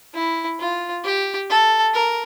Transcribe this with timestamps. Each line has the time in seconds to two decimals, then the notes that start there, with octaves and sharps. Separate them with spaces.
0.14 E4
0.59 F4
1.04 G4
1.50 A4
1.94 A#4